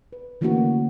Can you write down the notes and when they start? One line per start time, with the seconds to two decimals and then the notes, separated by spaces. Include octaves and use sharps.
0.13 B4
0.41 D3 E3 A3 A#3 C#4 F#4